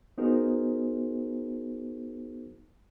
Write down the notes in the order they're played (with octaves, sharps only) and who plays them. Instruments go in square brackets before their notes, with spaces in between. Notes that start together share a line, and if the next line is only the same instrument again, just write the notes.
[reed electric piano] B3 D#4 F#4 G#4 A#4 C5